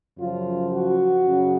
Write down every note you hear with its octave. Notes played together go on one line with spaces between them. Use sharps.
F#2 C#3 F3 F4
F#4
F#2 C#3